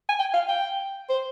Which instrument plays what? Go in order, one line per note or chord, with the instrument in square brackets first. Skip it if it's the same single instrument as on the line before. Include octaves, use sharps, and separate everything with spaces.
[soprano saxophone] G#5
G5
F5
G5
C5